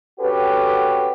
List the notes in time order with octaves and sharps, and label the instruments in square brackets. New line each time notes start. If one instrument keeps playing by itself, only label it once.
[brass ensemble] C#4 F#4 G4 A4 B4